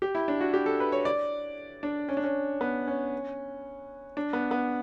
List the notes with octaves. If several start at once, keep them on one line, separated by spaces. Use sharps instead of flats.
G4
E4
D4
F#4
G4
A4
B4
C#5
D5
D4
C#4
D4
C#4
B3
C#4
D4
B3
B3